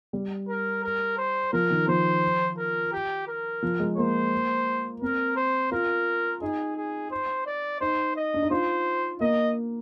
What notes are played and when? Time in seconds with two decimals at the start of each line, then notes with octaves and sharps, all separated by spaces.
0.13 G3
0.49 A#4
0.83 A#4
1.18 C5
1.52 F3 A#4
1.70 D#3
1.88 F3 C5
2.58 A#4
2.93 G4
3.28 A#4
3.63 F3
3.80 G#3
3.97 A#3 C5
5.02 C4 A#4
5.36 C5
5.72 F4 A#4
6.41 D#4 G#4
6.76 G#4
7.11 C5
7.47 D5
7.80 D#4 C5
8.16 D#5
8.34 D4
8.42 D#4
8.51 F4 C5
9.20 A#3 D#5